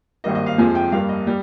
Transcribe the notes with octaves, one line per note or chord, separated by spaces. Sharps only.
G#1 G2 G3 A#3 D#5
D#5
F5
F2 C3 F3 G#3 G#5
G5
G2 G3 A#3 F5
D#5
G3